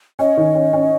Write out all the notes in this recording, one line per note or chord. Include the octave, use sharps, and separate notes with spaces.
C#4 D#5
D#3
C#4
C#4